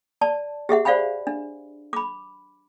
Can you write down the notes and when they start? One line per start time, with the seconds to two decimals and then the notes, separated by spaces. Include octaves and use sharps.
0.21 D5 A5
0.69 G4 G#4 E5 F#5
0.85 C5 D5 F5 F#5 G#5 B5
1.27 D4
1.93 B5 D6